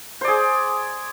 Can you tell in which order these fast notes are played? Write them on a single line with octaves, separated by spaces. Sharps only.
C5 D5 G#4